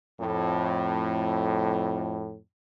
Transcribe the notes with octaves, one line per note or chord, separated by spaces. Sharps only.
F2 A2